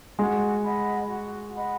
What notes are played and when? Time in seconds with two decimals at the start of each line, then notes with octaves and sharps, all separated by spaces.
0.19 G#3 F#4
0.63 D#5 F#5 B5
1.09 F#4
1.54 D#5 F#5 B5